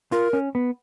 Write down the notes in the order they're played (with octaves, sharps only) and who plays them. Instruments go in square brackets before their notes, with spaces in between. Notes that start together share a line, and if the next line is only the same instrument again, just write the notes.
[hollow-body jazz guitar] F4 [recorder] A#4
[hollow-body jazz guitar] C#4
B3